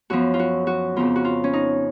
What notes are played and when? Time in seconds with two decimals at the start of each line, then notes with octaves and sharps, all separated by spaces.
0.10 F#2 F3 B3 F#4
0.34 F4
0.39 F#4
0.67 F#4
0.96 F2 C#3 F3 B3 F4
1.16 F#4
1.25 F4
1.44 C#4
1.53 D#4